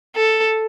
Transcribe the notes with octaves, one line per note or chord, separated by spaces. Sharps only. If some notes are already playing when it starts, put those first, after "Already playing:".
A4